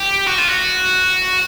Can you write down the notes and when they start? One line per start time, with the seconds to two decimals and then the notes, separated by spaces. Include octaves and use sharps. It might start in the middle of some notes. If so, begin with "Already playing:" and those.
Already playing: G4
0.27 F#4
0.38 F4
0.48 F#4